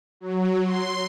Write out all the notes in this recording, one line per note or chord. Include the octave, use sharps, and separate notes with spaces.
F#3
C6